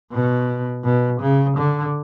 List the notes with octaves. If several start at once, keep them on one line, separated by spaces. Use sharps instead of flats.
B2
B2
C#3
D3